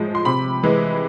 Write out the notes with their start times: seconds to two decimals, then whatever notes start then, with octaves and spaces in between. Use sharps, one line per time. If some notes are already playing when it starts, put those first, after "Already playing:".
Already playing: A2 F3 G#3
0.15 C6
0.25 C3 B5
0.63 E3 G#3